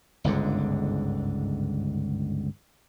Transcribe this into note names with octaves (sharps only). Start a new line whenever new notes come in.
G1 C#2 G#2 D3